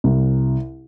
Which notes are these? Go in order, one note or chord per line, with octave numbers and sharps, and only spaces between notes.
C2